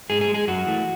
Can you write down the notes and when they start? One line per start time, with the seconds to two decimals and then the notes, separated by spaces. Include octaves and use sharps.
0.10 G#2 G#4
0.21 G#4
0.28 G#3
0.34 G#4
0.48 F#2 F#4
0.66 E3 A3